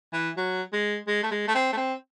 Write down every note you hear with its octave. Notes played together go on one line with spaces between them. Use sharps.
E3
F#3
G#3
G#3
A3
G#3
A3
C4
A3
C4